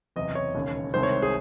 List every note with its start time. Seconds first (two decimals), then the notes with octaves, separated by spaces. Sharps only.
0.16 F#1 E2 C3 D#5
0.35 C#5
0.55 E1 D#2 C#3
0.93 C2 C3 D#3 G#3 C5
1.03 C#5
1.22 G#4